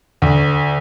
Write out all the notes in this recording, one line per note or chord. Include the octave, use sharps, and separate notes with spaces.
D2